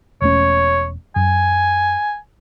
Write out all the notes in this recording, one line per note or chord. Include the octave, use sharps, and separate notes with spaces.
E1 A3 C#4 C#5
F#2 G#5